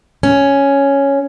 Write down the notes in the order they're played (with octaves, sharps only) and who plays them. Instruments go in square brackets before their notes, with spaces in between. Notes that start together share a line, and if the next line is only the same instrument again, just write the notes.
[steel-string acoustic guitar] C#4